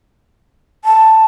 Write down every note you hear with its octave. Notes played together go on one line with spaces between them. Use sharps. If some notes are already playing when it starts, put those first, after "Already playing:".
A5